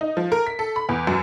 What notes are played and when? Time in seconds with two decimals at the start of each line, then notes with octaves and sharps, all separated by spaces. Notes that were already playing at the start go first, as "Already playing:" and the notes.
0.01 D#4
0.17 F3
0.32 A#4
0.47 B6
0.59 A4
0.76 B5
0.89 E2
1.07 F#2